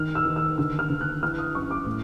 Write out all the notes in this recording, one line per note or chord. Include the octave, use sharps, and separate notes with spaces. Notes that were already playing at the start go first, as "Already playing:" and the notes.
Already playing: D#3 F6
E6
D#3
E6
D3 E6
F6
D3
F#6
E3 F6
D#6
F#2 C#6
D6
A2